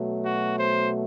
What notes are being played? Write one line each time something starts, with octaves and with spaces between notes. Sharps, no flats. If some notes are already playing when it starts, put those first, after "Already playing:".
Already playing: B2 F#3 A3
F#4
C5